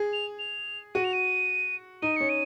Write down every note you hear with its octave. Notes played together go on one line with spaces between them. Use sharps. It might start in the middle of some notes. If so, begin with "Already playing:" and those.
Already playing: G#4
F7
F7
F#4 D#7
F7
D#7
D#4 D#7
C#4 C#7
D#7